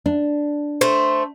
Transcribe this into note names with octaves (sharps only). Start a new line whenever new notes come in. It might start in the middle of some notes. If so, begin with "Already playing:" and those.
D4
A3 C5